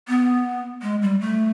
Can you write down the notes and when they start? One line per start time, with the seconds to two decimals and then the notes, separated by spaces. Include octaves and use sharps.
0.08 B3
0.82 G#3
1.02 G3
1.21 A3